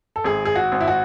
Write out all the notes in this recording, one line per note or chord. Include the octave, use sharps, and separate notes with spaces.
A4
G#1 G#4
G#4
F#4
G#1
E4
F#4